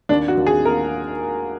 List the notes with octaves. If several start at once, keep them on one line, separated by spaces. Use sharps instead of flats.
D#2 D4
F#4
D#2
G#4
A#3 A#4